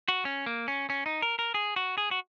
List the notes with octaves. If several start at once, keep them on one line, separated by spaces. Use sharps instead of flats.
F#4
C#4
A#3
C#4
C#4
D#4
A#4
A#4
G#4
F#4
G#4
F#4